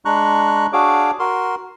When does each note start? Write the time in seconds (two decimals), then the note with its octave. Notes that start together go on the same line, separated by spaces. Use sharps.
0.05 G#3 D4 A#5 C#6 F#6
0.73 D4 F#4 G#4 C#5 F5 D6
1.19 F#4 A#4 C6